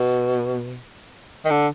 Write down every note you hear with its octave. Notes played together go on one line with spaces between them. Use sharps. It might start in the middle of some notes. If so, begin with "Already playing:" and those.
Already playing: B2
D#3
D3